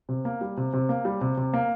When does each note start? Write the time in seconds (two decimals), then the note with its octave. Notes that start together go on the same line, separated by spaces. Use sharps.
0.09 C3
0.25 A#3
0.41 G3
0.57 C3
0.73 C3
0.89 A#3
1.05 G3
1.21 C3
1.37 C3
1.54 A#3